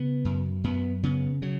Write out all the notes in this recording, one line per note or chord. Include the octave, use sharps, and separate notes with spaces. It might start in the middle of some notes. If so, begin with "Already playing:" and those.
Already playing: C#3 B3
F#2
F#2 B3
C#3 B3
C#3 F#3